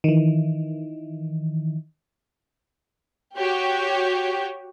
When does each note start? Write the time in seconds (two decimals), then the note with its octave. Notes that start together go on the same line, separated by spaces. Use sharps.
0.04 D#3 E3
3.37 F#4 G4 C#5